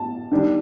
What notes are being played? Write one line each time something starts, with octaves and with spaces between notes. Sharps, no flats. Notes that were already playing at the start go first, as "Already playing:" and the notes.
Already playing: A5
D#3 G3 D4